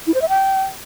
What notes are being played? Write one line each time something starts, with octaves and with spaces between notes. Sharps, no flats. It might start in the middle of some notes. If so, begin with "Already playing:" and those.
E4
C5
E5
G5